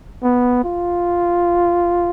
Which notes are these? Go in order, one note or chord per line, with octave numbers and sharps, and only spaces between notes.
B3
F4